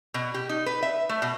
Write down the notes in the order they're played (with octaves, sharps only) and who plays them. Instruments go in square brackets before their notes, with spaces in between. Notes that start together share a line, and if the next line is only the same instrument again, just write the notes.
[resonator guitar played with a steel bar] B2
G4
D#4
B4
E5
A3
B2